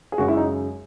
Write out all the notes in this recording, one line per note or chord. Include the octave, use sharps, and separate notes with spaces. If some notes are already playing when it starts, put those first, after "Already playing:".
G#4
F#2 C#3 G#3 F#4
E4
D#4